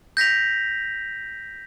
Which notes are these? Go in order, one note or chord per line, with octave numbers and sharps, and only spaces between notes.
G6 A#6 B6 F7